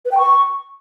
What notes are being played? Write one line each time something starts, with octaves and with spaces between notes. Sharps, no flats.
B4
G5
C#6